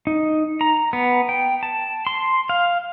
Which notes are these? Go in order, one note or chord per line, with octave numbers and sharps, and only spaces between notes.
D#4
A#5
B3
G5
A5
C6
F5